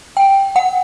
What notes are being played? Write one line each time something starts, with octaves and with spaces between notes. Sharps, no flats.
G5
F#5